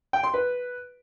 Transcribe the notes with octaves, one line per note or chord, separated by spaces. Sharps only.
G5
C6
B4